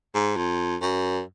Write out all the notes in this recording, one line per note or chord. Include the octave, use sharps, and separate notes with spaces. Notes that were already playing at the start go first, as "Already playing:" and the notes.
G#2
F2
F#2